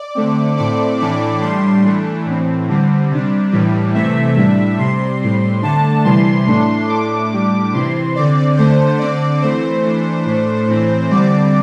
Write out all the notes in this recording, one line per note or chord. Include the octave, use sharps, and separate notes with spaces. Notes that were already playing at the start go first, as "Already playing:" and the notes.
Already playing: D5
D3 A3 C4
A2 A3 C4 D5
A2 E3 A3 D4 D5
A2 G3 D4 C6
E3 A3 D4
A2 E3 C4
D3 G3 C4
C3 G3 D4
A2 E3 G3
C3 E3 A3 C4 E5
A2 G3 D4 E5
C3 G3 C4 C6
A2 G3 C4
D3 A3 D4 A5
C3 E3 G3 C6
A2 A3 D4 C6
A2 A3 D4 D6
A2 G3 D4
C3 E3 C4 C6
D3 C4 D5
D3 A3 D4 C5
D3 C4 D5
E3 A3 C4 C5
E3 A3 D4
A2 A3 D4
A2 E3 C4
D3 G3 C4 D5